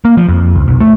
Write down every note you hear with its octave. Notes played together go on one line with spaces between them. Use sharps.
A#3
F3
F2
C#2
B1
A3